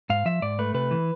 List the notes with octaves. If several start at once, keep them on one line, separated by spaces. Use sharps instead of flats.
G#2 F5
F3 E5
G#2 D5
A3 B4
C3 B4
E3